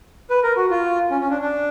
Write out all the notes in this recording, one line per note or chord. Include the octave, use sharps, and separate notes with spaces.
B4
A#4
F#4
F4
C#4
C#4
D4
D4